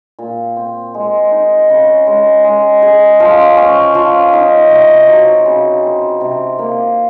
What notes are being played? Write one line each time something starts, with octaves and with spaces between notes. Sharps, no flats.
A#2
C4
G#3
D#4
C#3
G#3
G#3
G#4
F3
C#4
F3
D#4
C3
F#3
C#3
C4
C3
A#3